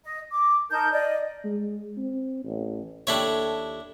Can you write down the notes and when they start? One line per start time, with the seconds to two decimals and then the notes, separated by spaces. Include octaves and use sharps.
0.03 D#5
0.32 D6
0.70 D#4 A#4 A5 G6
0.91 D5 D#5
1.45 G#3
1.97 C4
2.45 A1
3.07 D#2 D4 E4 G4 A4 C#5